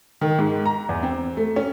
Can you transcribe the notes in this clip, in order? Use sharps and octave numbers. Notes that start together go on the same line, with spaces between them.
D#3
G#2
A#5
E2
C4
A3
C#4